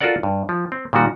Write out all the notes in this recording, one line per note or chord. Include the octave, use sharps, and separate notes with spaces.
F4 F#4 A4 A#4 D5 F#5
G2
F3
C4
A#2 D#3 G3 F#4